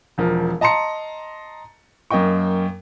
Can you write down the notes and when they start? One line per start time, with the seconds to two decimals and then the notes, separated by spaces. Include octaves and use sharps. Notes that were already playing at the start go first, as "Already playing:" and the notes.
0.18 E1 F3 A#4
0.61 D#5 A5 A#5 C6 C#7
2.11 F#2 A#3 D#5 G5 C#6